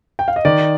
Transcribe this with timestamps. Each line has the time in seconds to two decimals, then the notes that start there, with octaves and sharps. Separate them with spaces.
0.19 G5
0.28 F5
0.36 D#5
0.45 D#3 D5